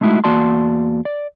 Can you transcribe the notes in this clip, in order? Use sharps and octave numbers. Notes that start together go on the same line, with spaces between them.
G#3 A3 D#4 E4 F#4
E2 A#3 F#4 D5 A5 C6
D5